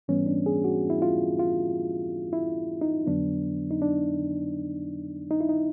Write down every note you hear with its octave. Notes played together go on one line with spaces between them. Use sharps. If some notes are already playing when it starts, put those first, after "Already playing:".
G#2 E3 G3 B3 C#4
D4
G#4
F#4
E4
F4
F4
E4
D#4
F2 D3 F#3 B3 D4
D#4
D4
D#4
E4
D#4